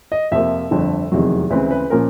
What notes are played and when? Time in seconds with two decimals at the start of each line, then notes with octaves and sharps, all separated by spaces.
0.12 D#5
0.31 F2 C3 F3 A#3 E5
0.71 G1 F2 D3
1.12 F1 E2 C3 D#3 F#3
1.50 D2 C#3 E3 G#3 C4 B4
1.71 B4
1.90 A#2 F3 A#3 C#4 A#4